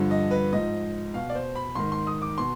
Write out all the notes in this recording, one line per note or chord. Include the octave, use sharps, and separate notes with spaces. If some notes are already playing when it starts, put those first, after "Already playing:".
Already playing: G2 D3 F3
D#5
B4
G#2 F3 D#5
B2 F5
D5
C5
B5
G#2 D#3 C6
C6
D#6
D6
B2 C6